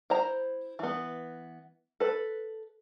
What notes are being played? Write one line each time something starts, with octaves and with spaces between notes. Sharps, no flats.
E4 C5 A#5
E3 B3
A4 B4